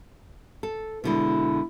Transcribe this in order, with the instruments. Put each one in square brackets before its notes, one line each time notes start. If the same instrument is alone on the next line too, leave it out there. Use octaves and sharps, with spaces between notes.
[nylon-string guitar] A4
[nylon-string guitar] B2 D3 G#3 [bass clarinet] E4